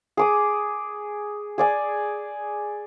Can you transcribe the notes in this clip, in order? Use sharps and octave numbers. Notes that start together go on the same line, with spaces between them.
G#4 D6 D#6
G#4 D5 G#5